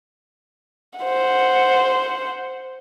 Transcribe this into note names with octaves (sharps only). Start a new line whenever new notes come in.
C5 F#5